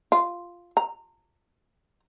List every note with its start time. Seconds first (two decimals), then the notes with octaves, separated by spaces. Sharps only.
0.12 F4
0.77 A#5